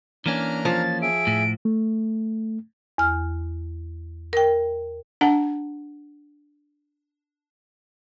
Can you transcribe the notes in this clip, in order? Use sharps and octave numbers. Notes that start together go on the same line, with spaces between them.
E3 A#3 C#4 D4 A#5 F6
F3 A6
G#4 E5 D7
A2
A3
E2 F6
A#4 G5
D4 F#5 A5